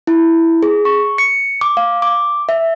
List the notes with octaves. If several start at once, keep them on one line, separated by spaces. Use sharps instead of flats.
E4
G#4
C#6
C#7
D6
F5
D6
E5